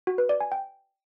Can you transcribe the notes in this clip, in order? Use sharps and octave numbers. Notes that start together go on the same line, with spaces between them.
F#4
B4
D5
G#5
G5